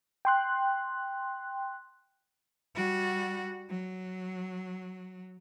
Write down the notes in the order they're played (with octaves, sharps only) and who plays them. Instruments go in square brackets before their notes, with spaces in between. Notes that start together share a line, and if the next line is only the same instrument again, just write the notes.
[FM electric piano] G5 C6 F#6
[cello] G3 F#4
F#3